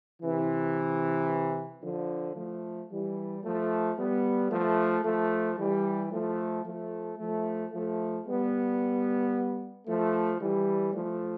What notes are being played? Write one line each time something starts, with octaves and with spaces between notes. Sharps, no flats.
C3 E3
D3 F3
F3 A3
E3 G3
F3 A3
G3 B3
F3 A3
F3 A3
E3 G3
F3 A3
F3 A3
F3 A3
F3 A3
G3 B3
F3 A3
E3 G3
F3 A3